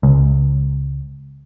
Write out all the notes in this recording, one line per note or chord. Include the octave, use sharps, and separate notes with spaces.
C#2